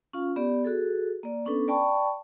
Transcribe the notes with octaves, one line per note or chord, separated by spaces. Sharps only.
C#4 F4 F5
B3 G4 D5
F#4 G#4 A4
A#3 D5
B3 C#4 D4 A4 B4
D5 G5 A5 B5 C#6